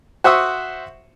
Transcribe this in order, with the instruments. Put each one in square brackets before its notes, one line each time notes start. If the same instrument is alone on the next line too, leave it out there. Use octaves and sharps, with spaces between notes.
[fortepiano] F#4 C5 E5 C#6 D#6 E6